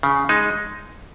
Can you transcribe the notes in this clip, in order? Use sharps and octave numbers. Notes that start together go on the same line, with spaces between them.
C#3
G#3 D#4